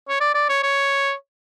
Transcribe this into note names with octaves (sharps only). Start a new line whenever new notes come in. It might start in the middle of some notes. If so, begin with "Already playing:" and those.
C#5
D5
D5
C#5
C#5